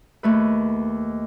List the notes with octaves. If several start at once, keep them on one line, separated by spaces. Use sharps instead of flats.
D#2 A3 B4